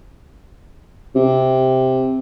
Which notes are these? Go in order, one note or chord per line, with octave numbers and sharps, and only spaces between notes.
C3